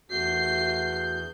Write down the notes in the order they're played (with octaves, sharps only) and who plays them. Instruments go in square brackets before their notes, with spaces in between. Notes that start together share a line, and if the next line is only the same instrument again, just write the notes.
[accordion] E2 G6 [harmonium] A3 F#4 [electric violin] C7